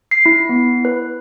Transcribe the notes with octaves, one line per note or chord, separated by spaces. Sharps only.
C7
E4
B3
B4